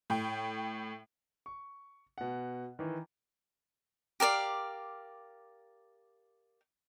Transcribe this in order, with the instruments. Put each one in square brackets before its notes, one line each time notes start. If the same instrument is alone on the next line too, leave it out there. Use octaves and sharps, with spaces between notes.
[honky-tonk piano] A2 G5
[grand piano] C#6
B2 F#5
D#3 E3
[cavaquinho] G4 A#4 D5 F5